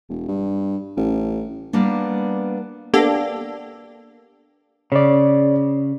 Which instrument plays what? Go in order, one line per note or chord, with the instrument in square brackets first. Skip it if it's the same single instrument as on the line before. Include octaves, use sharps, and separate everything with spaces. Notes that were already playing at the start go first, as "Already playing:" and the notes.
[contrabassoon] E1
G2
A1
[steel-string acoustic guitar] G3 A#3 B3 D4
[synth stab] A#3 B3 D4 G4 A4
[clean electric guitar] C#3 [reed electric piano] C#5 D5